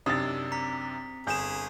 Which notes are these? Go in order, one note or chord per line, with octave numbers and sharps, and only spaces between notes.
F#2 C3 D4 D#4 D#6 E6 A6
C4 A#5 B6
G1 G#4 G6 E7